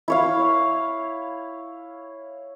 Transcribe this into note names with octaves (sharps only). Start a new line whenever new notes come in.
E4 C#5 F5